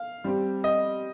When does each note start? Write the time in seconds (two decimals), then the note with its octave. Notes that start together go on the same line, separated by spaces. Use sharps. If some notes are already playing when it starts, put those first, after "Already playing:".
Already playing: F5
0.24 G3 C4 G4
0.64 D#5